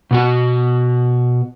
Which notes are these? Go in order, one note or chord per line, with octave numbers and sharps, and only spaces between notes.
B2 B3 F#4